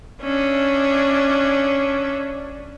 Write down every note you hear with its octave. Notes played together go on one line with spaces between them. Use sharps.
C#4 D4 E5